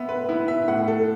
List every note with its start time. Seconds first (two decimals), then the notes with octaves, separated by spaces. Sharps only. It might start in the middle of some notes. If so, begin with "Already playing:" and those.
Already playing: B3 E5
0.09 B4
0.29 B3 E4
0.48 E5
0.67 A2 F#5
0.88 A4